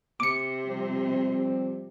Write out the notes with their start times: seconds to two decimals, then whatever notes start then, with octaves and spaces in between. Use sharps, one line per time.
0.20 C3 D6 C#7
0.67 F3 G3 C4